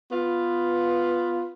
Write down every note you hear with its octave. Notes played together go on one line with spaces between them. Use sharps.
B3 F4